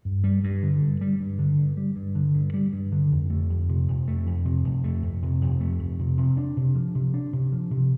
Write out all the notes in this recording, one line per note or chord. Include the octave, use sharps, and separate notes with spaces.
G2
G3
G2
D3
G2
G3
G2
D3
G2
G3
G2
D3
G2
G3
G2
D3
F2
A3
F2
C3
F2
A3
F2
C3
F2
A3
F2
C3
F2
A3
F2
C3
C3
D4
C3
F3
C3
D4
C3
F3
C3